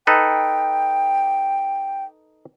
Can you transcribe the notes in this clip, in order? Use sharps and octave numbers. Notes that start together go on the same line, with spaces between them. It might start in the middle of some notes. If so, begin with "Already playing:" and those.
D#4 A4 B4 G5